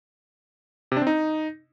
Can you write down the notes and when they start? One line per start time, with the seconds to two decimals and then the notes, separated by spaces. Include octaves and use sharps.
0.92 C3
0.97 D4
1.02 C4
1.07 D#4